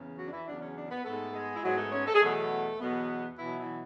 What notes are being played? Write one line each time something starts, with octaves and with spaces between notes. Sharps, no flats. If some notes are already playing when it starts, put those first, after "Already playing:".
Already playing: E2 C#3
F#3 F#4
D4
E3 E4
E2 C#3 F#3 D4
C#4
D4
B3 B4
G#2 G#3 A3 B3 A4
G#3 G#4
E4
G#2 F#3 G#3 B3 F#4
A3 A4
C#4 C#5
A4
G#4
E2 B2 F#3 A3 B3 A4
E2 B2 F#3 B3
B2 E3 F#3 B3 E4
E3 E4